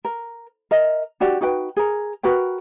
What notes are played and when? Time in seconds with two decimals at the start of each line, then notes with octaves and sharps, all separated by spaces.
0.05 A#4
0.71 A#4 D#5 E5
1.20 D4 F#4 G4 D5
1.41 D#4 F#4 B4 G5
1.77 G#4 A#4
2.23 F#4 A#4 B4 G5